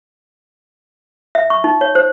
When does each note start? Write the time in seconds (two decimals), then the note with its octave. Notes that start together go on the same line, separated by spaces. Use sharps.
1.35 E5
1.50 C#6
1.64 D#4
1.81 C#5
1.95 C5